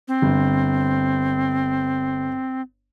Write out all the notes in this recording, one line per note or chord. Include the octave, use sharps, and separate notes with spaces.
C4
G1